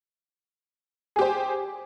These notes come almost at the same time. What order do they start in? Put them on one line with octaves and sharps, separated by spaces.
G#4 G4 C5